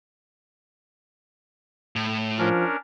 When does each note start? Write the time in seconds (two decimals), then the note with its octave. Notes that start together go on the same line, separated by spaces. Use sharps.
1.96 A2
2.39 F3 C#4 D4 A#4